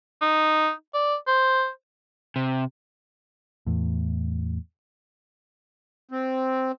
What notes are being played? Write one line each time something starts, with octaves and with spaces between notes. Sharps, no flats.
D#4
D5
C5
C3
E2 A2
C4